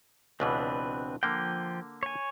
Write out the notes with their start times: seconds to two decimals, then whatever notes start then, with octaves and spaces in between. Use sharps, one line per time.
0.40 C#2 B2 E3 C4 D4 B4
1.23 D3 F3 A#3 G5
2.03 C#5 G#5